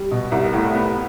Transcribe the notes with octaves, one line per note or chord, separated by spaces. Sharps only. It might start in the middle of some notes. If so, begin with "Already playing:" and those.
Already playing: G3
B2
C2
A2
B3